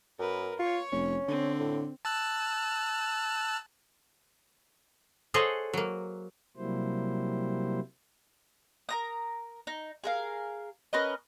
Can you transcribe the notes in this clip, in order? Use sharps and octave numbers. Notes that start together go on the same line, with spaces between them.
F#2 A#4 B4
F4 C#5 C#6
F1 C#4
D3 C4
A2
A5 E6 F#6
G#4 A4 C5 C#5 D#5 F#5
F#3 A#3
C3 F#3 G3 A#3 E4 C5
A#4 A#5 D#6
D#4
G#4 A#4 F5
C#4 A#4 B4 D#5